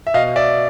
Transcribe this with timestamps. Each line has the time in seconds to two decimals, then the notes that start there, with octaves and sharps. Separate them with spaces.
0.07 E5
0.14 B2 D#5 F5
0.36 D5 E5